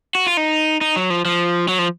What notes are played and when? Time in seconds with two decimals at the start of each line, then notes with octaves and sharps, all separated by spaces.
0.15 F#4
0.26 F4
0.37 D#4
0.81 D#4
0.96 F#3
1.10 F3
1.25 F3
1.68 F#3
1.79 F3